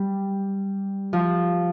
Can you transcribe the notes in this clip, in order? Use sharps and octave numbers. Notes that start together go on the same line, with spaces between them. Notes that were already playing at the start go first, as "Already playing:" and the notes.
Already playing: G3
F3